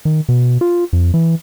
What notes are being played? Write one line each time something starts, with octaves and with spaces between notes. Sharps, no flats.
D#3
B2
F4
F2
E3